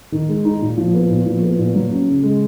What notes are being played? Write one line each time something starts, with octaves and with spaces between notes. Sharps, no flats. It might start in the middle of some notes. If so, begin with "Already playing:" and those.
D#3
G#3
D#4
A#2
F3
B3
A#2
F3
B3
A#2
F#3
C#4
C#3
G#3